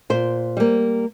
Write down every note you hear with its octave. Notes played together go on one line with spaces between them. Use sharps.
A#2 C5
G3 A#3